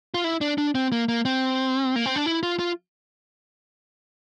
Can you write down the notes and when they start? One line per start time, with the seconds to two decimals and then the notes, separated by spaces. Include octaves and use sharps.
0.14 F4
0.24 E4
0.41 D4
0.58 D4
0.75 C4
0.92 A#3
1.08 A#3
1.25 C4
1.96 A#3
2.06 C4
2.16 D4
2.26 E4
2.43 F4
2.59 F4